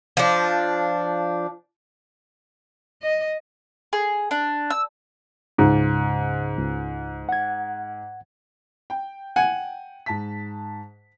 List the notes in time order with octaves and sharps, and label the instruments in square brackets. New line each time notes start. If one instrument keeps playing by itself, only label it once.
[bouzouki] F3 D4
[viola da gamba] D#5
[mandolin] G#4
D4
E6
[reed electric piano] C#2 C#3 [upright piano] G#2
[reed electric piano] C#2
F#5 G#6
[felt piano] G5
[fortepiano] F#5 G#5
[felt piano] G#2 A5 B6